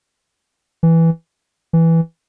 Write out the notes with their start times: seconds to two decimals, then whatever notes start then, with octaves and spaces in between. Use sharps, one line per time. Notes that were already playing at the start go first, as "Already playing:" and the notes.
0.83 E3
1.73 E3